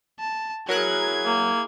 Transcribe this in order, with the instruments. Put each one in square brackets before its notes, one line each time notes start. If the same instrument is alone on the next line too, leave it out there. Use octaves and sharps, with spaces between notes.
[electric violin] A5
[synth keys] F#3 A#4 F#6 [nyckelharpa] E4 G#4 [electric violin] G#6
[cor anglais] A#3